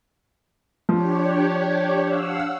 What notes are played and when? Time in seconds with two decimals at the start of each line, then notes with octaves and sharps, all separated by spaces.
0.89 F3 D4 G4 C#5
2.05 F5 F#5 E6